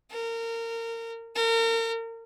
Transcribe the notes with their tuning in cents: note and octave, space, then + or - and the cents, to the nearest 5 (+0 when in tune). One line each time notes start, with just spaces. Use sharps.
A#4 -25
A#4 -35